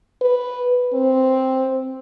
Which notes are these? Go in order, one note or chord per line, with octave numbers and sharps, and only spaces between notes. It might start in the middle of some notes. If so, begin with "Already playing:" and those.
B4
C4